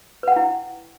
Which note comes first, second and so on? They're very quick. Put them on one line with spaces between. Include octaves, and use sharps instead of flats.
B4 F#5 G5 E4